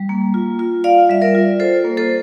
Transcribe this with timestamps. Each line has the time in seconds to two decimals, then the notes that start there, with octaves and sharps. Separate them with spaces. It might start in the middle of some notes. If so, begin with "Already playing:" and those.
Already playing: G3
0.09 A#3
0.34 F4
0.59 F4
0.84 F4 D5 F5
1.10 G3 E5
1.22 A#4 D5
1.35 F4
1.60 F4 A4 C5
1.85 A#3
1.97 A4 C5